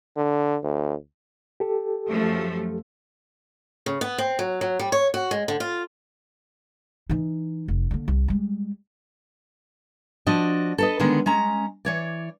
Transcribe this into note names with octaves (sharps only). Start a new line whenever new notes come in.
D3
D2
G4 A4
F#2 F3 A3
C#3
B3
C4
F#3
F#3
G3
C#5
F#4
G#3
D3
F4
E3 D#4
F1
D3 A#3
C2
G3 G#3
F3 D4 F#4 D#5
A4 B4 D#5
D3 D#3 G#3 B3
G#3 C#4 A#5
E3 C#5 D5